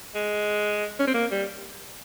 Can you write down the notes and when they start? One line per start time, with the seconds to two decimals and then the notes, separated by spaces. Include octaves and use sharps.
0.15 G#3
0.99 C#4
1.07 C4
1.14 A#3
1.31 G3